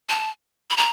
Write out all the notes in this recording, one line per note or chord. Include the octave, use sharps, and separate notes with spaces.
A5
B5
A#5